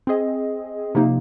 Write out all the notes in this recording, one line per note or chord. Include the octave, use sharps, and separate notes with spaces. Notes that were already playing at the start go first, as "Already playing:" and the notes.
C4 G#4 D#5
C3 F3 A#3 D#4